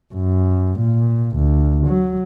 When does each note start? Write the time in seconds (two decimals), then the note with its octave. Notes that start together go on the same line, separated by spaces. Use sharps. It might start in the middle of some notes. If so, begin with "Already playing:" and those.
0.14 F#2
0.79 A#2
1.36 D2
1.87 F#3